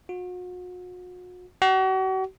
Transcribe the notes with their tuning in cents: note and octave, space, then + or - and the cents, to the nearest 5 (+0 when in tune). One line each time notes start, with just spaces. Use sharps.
F#4 -40
F#4 +40